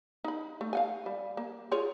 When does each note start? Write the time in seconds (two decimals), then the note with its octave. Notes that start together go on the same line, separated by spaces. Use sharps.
0.24 D#4 B5
0.61 A3
0.73 F5 F#5 G#5
1.06 G3
1.37 A#3
1.71 F4 G#4 C#5